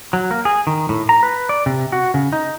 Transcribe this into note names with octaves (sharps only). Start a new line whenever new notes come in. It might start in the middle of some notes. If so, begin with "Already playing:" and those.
F#3
A#3
G#4
D#3
A2
A#5
B4
D5
C3
F#4
C#3
D#4